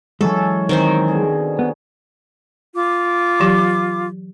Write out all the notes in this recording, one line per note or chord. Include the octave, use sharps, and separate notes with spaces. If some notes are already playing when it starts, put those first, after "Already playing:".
E3 F#3 G#3 C#4 A4 G#5
D#3 C4 C5
B2 D3 G#4
B3
F4 D6
E3 F#3 G4